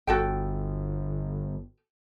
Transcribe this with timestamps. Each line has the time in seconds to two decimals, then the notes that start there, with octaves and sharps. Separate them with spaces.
0.07 G1 F#4 A4 G5